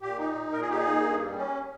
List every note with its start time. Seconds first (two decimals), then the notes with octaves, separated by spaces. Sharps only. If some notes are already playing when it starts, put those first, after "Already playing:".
0.02 A#2 G4
0.18 D#4
0.35 A#2
0.52 A#2 A#4
0.61 G#4
0.69 D#4 G4
0.78 G#4
0.86 A#3
1.03 G2
1.20 G3
1.37 C#4